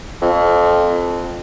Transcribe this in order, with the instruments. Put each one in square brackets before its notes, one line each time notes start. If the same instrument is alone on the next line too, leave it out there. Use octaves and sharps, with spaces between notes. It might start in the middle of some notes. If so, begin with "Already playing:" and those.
[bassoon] F2